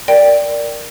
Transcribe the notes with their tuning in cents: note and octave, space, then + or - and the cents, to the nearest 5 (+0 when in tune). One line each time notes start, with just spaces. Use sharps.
A#4 +0 D5 +0 G5 +0